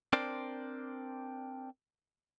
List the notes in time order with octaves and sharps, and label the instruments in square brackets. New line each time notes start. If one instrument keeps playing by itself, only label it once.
[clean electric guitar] C4 D4 A#4 C5 D5